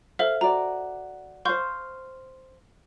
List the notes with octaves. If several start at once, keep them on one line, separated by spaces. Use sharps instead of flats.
A4 C5 E5 F5
F#4 D5 A#5
C5 F5 C6 C#6 G6